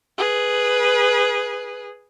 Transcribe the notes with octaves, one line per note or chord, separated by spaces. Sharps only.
G#4 B4